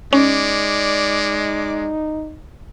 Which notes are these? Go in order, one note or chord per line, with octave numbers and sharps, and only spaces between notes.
G#3 C#4 D#4 D5 D6